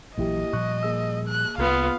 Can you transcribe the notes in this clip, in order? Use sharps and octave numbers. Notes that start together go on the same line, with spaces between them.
A#1 E3 F#3 A#3 E4 G4 D#5
A#2 F3 G3 C#6 F#6
A#3 G#4 E6
F#6
C2 B3 F4 F5